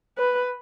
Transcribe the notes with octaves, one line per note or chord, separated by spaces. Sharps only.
B4